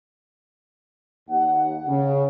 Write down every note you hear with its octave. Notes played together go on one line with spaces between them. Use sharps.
D#2 F#5
C#3